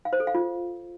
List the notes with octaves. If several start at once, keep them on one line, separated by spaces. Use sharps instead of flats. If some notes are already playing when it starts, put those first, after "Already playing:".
F5
C5
A4
F5
F4